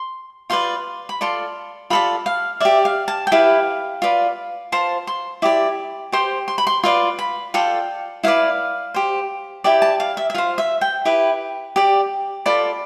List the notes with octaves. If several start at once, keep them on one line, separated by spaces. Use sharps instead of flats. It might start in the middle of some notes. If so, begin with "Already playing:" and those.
Already playing: C6
F4 B4 D5 C6
B5
F4 A4 D5 C6
F4 A4 D5 B5
F5
G4 D5 E5
F5
A5
G5
E4 G4 B4 F5
F4 B4 D5
F4 C5 A5
C6
E4 G4 D5 D6
G4 C5 C6
C6
B5
C6
F4 B4 D5 C6
B5
F4 A4 D5 G5
E4 B4 D5 F5
G4 C5
E4 G4 D5 G5
A5
F5
E5
E5
F4 C5 F5
E5
G5
E4 G4 B4
G4 D5
F4 A4 D5 B5